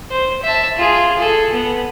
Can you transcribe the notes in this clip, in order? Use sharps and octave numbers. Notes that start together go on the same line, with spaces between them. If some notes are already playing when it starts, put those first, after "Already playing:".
C5
E5 A5
F4 G#4
G#4 A4
B3